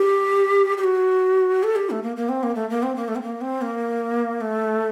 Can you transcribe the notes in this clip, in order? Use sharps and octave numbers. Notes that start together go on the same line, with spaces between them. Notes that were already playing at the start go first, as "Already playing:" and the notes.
Already playing: G4
G4
F#4
A4
G4
A3
A#3
A#3
C4
A#3
A3
A#3
C4
A#3
A3
C4
A#3
C4
A#3
A3